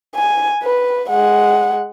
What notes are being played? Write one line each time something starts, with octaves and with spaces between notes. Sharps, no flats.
G#5
B4
G#3 F#5